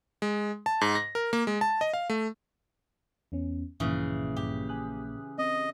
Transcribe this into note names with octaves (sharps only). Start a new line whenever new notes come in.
G#3
A5
G#2
A#6
A#4
A#3
G#3
A5
D#5
F5
A3
E2 B3 C#4
A#1 G2 A#2 C#3 E3
G2 G4
G#5 D#6 F#6
C4 D#5